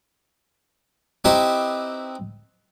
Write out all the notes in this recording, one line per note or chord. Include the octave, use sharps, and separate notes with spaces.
C4 D#4 E4 G4 B4 C5